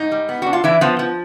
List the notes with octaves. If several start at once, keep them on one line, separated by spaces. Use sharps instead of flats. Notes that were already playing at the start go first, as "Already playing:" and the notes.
Already playing: G#2 D#4
G3
B3
D4 F#4
F4
E3 D4 E4
F3 B3 F4
F3